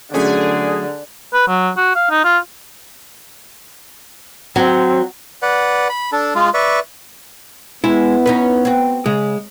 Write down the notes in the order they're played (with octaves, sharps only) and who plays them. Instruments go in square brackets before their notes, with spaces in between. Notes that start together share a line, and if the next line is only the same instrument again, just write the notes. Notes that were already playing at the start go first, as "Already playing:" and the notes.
[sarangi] D3 [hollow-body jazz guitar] F#3 A3 C#4 [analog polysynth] G#4
[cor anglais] B4
F#3
F#4
F5
D#4
F4
[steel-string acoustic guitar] F#3 [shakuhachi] C4
[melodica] B4 D5 F#5
B5
D4 A4
G#3 F4
B4 D5 E5 C#6
[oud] G#3 [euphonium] B3 [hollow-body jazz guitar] E4
[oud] C#4 D#4 B4
C4 F#4
[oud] C#3 [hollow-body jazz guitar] G#3